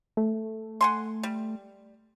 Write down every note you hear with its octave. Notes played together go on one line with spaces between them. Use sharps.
A3
F#5 G#5 C6
G3